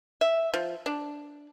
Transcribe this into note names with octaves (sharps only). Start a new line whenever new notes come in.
E5
F3
D4